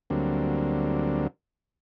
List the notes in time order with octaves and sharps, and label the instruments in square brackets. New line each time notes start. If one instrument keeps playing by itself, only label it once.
[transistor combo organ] D2 D3 F#3 G3 A#3 C4